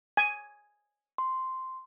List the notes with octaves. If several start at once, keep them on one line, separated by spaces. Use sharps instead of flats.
G#5
C6